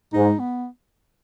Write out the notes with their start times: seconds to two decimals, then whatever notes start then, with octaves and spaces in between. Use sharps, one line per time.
0.13 G#2 D#4
0.39 B3